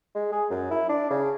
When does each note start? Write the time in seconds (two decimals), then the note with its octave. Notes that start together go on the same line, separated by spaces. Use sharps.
0.15 G#3
0.32 G#4
0.50 F#2
0.71 E4
0.89 D4
1.10 C#3